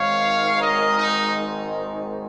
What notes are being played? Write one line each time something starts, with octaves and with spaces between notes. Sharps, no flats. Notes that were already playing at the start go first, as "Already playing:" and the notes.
Already playing: G#1 G#2 D#3 G#3 C#5 F5
A#4 D#5
D#4